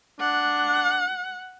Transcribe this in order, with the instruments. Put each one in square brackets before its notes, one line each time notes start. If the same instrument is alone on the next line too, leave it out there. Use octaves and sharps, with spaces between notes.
[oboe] D4 [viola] F#5